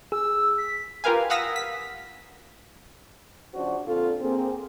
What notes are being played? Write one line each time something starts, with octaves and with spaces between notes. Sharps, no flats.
G#4 E6
B6
F4 G4 A#4 B4 F5 G#5
F5 F#5 D#6 E6 A#6 B6
B6
C#3 F3 D4 F#4 C5 D5
A#2 D3 C4 F4 A4
A#3 C4 G#4